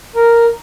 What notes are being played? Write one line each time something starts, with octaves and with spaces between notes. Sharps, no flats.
A#4